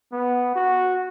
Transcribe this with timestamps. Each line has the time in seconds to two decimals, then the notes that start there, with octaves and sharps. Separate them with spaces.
0.12 B3
0.56 F#4